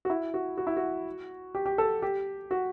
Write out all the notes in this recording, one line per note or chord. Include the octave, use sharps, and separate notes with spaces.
F#4
E4
F#4
F#4
E4
F#4
G4
G4
A4
G4
F#4